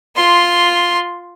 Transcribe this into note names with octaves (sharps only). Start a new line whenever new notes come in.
F4 C6